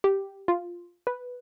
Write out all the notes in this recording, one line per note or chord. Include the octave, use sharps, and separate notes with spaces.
G4
F4
B4